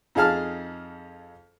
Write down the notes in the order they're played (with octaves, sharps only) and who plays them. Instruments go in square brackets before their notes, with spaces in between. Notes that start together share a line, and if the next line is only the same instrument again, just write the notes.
[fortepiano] F2 D#4 G#4 F5 A5 F6